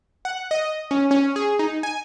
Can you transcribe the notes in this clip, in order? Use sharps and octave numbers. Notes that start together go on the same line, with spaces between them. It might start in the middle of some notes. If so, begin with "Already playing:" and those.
F#5
D#5
C#4
C#4
G#4
D#4
G#5